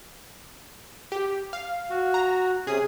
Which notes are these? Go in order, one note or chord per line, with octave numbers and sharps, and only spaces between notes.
G4
F5
F#4
A#5
C3 C#4 G#4 D#6